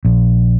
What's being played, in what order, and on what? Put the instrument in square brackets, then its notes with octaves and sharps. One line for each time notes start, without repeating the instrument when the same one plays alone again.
[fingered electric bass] A#1